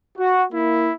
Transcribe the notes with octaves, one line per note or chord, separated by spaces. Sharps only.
F#4
A#3 E4